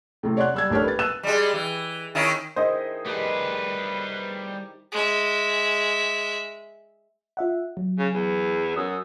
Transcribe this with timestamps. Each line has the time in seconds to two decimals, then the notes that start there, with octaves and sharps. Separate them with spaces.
0.23 A2 C3
0.37 C#5 D5 F#5 C6 F#6
0.54 G3 E6 G#6
0.70 A1 D4 G4 A4 C#5 F6
0.84 B4 A6
0.99 E6 F#6 D#7 E7
1.23 G3 G#3
1.53 E3
2.15 D#3 C#4 E4
2.56 D#3 E4 G#4 C5 D#5
3.06 G3 G4 G#4 B4 A5
4.92 G#3 E5
7.37 F4 E5 F#5
7.77 F#3
7.99 C#3
8.14 E2
8.77 F#2 D#6 E6